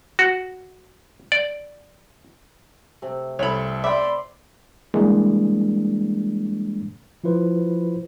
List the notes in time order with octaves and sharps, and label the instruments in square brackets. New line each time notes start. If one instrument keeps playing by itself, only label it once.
[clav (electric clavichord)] F#4
D5
[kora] C3 A3
[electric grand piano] C2 A4 [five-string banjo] C#5 B5
[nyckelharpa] D5 C6 [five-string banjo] E5 G5 [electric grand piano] B5 D6 E6
[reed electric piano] E3 G3 G#3 A#3 D4
[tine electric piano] F3 E4 F4 B4 C5